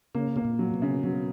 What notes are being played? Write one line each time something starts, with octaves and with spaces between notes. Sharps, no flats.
C#3 A#3
B2 A#3
A#2
F#3
B2
C#3
B2 F#3